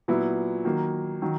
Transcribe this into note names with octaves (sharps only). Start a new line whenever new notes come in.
A#2 F#3 B3 E4
D#3 F#3 A#3
D#3 F#3